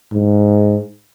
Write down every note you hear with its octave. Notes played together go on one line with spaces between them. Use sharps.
G#2